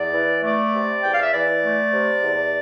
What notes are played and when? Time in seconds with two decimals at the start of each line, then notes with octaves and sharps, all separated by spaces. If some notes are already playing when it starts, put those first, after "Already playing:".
Already playing: E2 D5
0.14 E3
0.44 A3 D5
0.73 C3
1.03 E2 G5
1.14 F5
1.23 E5
1.32 E3 D5
1.63 A3
1.93 C3
2.22 E2